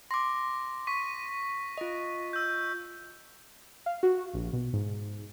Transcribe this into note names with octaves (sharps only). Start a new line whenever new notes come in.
C6 D6 A#6
C#6 B6 D#7
F4 D#5
E6 G6
F5
F#4
A#1
B2
G#2